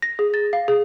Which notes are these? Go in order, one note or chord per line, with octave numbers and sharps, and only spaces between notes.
A#6
G#4
A6
F5
G#4